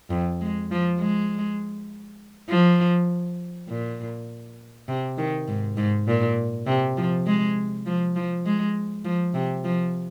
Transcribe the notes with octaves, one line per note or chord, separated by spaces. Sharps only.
F2
G#3
F3
G#3
F3
A#2
C3
D#3
G#2
G#2
A#2
C3
F3
G#3
F3
F3
G#3
F3
C3
F3